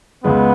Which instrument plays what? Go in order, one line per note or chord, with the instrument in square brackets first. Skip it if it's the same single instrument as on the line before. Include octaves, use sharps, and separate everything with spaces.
[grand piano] C#2 C#3 G#3 [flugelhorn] B3